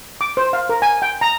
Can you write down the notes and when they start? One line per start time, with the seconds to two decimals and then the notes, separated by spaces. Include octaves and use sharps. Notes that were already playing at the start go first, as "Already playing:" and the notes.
0.21 D6
0.37 C5
0.53 F5
0.69 A#4
0.82 G#5
1.02 G5
1.21 A#5